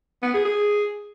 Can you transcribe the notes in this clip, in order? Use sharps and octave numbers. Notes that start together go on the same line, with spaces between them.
B3
G#4
G#4